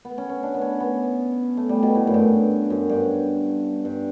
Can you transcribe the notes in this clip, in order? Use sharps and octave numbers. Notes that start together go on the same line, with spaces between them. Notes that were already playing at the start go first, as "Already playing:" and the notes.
B3
C#4
C#4
D4
B3
C#4
B3
A3
G3
B2
A2
F#2
G2
F#2
G2
G2